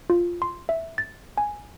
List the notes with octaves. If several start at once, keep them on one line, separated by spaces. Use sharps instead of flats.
F4
C6
E5
A6
G#5